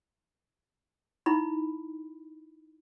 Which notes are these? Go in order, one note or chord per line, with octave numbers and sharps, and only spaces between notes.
D#4 E4 B5